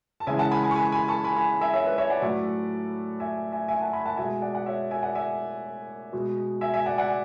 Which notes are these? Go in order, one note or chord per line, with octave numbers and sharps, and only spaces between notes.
A5
C#3 E3 G#3 E5 G#5
F#5 A5
G#5 B5
G#5 B5
C#6
G#5 B5
G#5 B5
A5 C#6
G#5 B5
G#5 B5
E5 G#5
C#5 E5
B4 D5
C#5 E5
D5 F#5
A2 F#3 A3
E5 G#5
E5 G#5
E5 G#5
F#5 A5
G#5 B5
F#5 A5
B2 G#3 E5 G#5
D5 F#5
F#5
C#5 E5
E5 G#5
D5 F#5
E5 G#5
B2 G#3
E5 G#5
E5 G#5
D5 F#5
D5 F#5